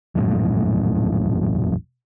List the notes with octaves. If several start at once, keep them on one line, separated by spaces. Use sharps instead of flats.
E1 A#1 F#2 A2